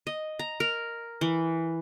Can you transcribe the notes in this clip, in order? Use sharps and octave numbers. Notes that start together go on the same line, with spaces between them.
D#5
A#5
A#4
E3